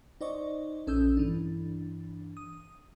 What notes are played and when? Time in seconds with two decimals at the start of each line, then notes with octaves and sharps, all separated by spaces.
0.21 D#4 C5 D5 D#5 C#6
0.87 A#1 C#4 A4 D#6 E6 G6
1.17 G2 E3 D4
2.37 D#6